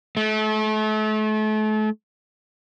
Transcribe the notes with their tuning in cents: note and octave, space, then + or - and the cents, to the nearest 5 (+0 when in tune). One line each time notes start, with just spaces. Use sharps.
A3 -35